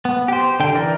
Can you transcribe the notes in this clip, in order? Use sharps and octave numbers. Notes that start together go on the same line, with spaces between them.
B3
G4 C5
D3 G5
E3 A#4 D5